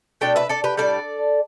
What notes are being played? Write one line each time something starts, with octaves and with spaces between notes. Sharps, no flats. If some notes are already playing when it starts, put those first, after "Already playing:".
B2 A3 D4 D5 G5
B4 E5
A4 D5
G4 B4
A2 G3 D4 A4 D5